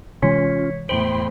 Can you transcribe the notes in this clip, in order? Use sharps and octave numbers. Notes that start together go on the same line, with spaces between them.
C3 E3 G#3 C#4 F4 C#5 B6 C#7
E2 A2 C5 G5 B5 C6